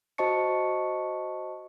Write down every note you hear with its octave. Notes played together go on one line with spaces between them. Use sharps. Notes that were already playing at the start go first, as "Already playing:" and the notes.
F#4 C5 D#5 A5 C#6 C#7